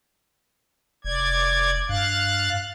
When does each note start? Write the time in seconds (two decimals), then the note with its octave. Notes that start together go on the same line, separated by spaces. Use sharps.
1.05 F1 D5 G#6
1.89 G2 F5 F#6 A6